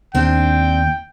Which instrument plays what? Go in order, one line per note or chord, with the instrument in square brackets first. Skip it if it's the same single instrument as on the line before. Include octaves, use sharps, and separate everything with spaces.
[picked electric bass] D#2 [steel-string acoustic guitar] C4 D4 [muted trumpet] G5